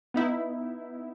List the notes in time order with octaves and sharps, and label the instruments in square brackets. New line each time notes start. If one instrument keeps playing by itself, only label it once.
[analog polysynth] B3 D#4 E4